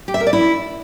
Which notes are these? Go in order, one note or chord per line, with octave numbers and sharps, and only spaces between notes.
G4
E5
A#4
D5
E4